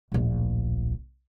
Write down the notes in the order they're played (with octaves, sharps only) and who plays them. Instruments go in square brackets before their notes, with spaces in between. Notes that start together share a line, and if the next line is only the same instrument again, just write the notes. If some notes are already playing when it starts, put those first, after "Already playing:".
[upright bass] D1 A#1